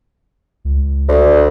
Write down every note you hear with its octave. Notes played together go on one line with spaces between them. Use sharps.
C#2
D2